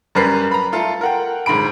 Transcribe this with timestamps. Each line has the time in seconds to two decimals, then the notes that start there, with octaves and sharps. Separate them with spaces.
0.15 F#2 G3 A#4 B4 C7
0.51 A#5 B5
0.72 A3 F4 A4
1.01 A#4 F#5 G5
1.46 D#1 G#2 D3 B5 D7